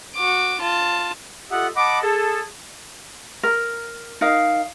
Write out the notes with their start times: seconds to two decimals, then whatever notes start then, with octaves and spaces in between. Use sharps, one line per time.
0.16 F#4 D6
0.61 F4 A5
1.51 F4 G4 A4 D#5 E5 F#5
1.76 D#5 F#5 A5 B5 D6
2.02 G#4 A4
3.43 A#4
4.21 D#4 A#4 F5